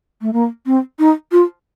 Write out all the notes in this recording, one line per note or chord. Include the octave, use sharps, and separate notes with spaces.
A3
A#3
C4
D#4
F4